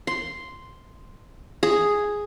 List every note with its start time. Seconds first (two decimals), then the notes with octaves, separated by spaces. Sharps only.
0.07 C6
1.63 G#4